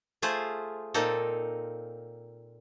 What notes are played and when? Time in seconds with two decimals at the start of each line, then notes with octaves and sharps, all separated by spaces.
0.22 A3 F4 G#4 C5
0.94 A#2 A#3 C4 D#4 A4